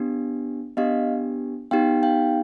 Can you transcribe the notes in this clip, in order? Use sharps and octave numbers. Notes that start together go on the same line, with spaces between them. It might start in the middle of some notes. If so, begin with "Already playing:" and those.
Already playing: B3 D4 G4
B3 D4 G4 D#5 F5
B3 D#4 G4 F5 G5
F5 G5